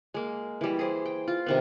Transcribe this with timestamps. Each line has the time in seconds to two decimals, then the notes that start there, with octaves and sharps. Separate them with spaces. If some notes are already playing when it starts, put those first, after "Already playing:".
0.14 G#3 A#3
0.61 E3 G3
0.79 G#4 C5
1.06 G5
1.28 F4
1.46 C3 D#3 B3